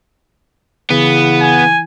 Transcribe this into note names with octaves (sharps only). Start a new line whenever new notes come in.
C#3 E3 B3
G#5